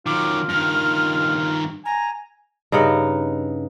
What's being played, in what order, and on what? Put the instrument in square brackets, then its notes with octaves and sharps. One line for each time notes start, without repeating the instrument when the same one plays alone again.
[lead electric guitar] D#3 F#3 [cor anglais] F4 [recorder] D6
[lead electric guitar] G2 D#3 [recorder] F6
[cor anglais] G#5 [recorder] A#5
[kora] G2 C#3 D#4 F#5